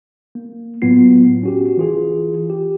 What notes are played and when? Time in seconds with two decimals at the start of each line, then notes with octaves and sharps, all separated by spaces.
0.35 A#3
0.82 A2 F#3 B3 F4 C7
1.43 C#4 F#4 G4
1.78 E3 F4 G#4
2.50 G4